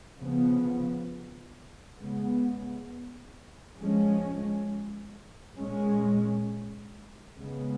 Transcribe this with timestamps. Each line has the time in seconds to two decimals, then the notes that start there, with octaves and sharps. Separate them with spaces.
0.19 C#3 F3 B3
1.99 C#3 G#3 B3
3.79 F3 G#3 C#4
5.58 A#2 G#3 C#4
7.38 C#3 G#3 B3